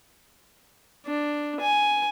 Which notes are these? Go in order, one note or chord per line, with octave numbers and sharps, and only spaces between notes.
D4
G#5